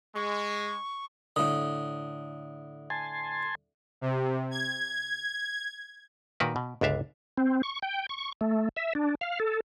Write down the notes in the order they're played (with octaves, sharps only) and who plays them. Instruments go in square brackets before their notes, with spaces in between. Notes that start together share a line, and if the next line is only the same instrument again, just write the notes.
[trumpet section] G#3 [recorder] C#6
[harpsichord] A2 D3 [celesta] D#6
[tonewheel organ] G#5 A5 C6
[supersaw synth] C3
G#6
[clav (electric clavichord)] A#2 D#3 F#4 A#4 B4
B2
G1 C#2 D4 E5 F5
[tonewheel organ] C4
C#6
G5
C#6
A3
E5
D4
F5
A4